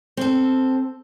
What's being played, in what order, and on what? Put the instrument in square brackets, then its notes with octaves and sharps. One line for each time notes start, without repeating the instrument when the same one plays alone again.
[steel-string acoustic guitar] C4 A4